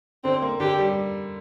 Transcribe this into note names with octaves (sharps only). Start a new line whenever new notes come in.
D3 C4
A#3
D3 G4
G3